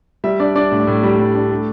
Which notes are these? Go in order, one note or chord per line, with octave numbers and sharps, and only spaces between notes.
G3 E5
D4 D5
D4 D5
A2
A2
G3
G3
D4
A3